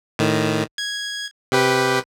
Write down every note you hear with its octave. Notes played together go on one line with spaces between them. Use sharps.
A2 D#3
G#6
C3 G4 B4